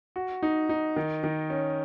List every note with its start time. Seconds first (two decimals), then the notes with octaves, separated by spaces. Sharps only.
0.16 F#4
0.43 D#4
0.69 D#4
0.96 D#3
1.24 D#3
1.50 C#4